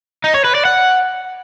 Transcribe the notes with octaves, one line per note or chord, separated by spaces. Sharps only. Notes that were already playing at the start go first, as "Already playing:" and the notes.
D#4
C#5
B4
D5
F#5